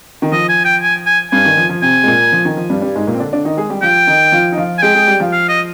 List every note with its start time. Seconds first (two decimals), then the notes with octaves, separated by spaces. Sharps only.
0.22 D#3
0.32 F3 D#5
0.49 G#5
0.65 G5
0.82 G#5
1.06 G#5
1.31 G2 G3 G#5
1.45 D#3
1.57 F3
1.69 F3
1.82 C3 C4 G#5
2.03 G#3
2.07 A#2 A#3
2.32 F3
2.45 D#3
2.57 F3
2.70 G2 G3
2.82 G2 G3
2.95 G#2 G#3
3.07 A#2 A#3
3.14 C4
3.19 D3 D4
3.32 D3 D4
3.45 D#3 D#4
3.57 G#3 G#4
3.70 G3 G4
3.82 F3 F4 G5
4.07 D#3 D#4
4.32 F3 F4
4.52 D#4
4.58 F3 F4
4.78 G#5
4.82 G#3 G#4 G5
4.95 G#3 G#4
5.07 G3 G4
5.20 F3 F4
5.32 F5
5.49 D#5